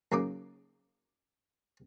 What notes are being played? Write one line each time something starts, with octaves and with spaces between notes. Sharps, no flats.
F#2 C#3 A#3 D#4 D6 D#6